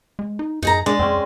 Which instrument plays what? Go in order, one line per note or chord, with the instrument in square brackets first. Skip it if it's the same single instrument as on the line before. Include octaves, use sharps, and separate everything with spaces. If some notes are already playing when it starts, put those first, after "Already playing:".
[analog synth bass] G#3
D#4
[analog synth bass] F#2 [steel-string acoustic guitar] D#4 G#4 A#5
[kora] G#3 [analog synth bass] D4 [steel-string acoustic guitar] D5
[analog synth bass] F2 [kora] C4 C#4